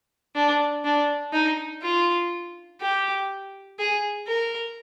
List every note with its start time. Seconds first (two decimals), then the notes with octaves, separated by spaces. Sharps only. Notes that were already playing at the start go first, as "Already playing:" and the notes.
0.35 D4
0.85 D4
1.33 D#4
1.83 F4
2.81 G4
3.79 G#4
4.27 A#4